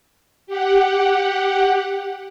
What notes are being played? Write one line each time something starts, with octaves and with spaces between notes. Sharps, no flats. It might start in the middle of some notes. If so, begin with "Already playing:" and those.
G4 F#5